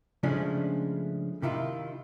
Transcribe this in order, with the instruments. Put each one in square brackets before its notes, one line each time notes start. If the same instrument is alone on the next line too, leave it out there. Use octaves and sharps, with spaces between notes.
[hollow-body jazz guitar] C#3 F3 G#3 A3 C#4 D4
C3 D#3 E4 F4